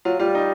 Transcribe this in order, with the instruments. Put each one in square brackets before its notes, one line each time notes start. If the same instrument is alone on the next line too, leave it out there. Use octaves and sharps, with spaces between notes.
[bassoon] F#3 [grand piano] F4
[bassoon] G3 [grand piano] F4
[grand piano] D#4